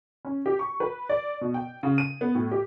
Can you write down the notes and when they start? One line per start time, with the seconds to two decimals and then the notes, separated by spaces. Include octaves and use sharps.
0.25 C#4
0.46 G4
0.59 C#6
0.80 B4
1.09 D5
1.41 B2
1.54 G5
1.83 C#3
1.98 D#7
2.21 B3
2.35 A2
2.51 G4